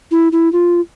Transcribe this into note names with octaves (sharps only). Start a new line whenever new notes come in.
E4
E4
F4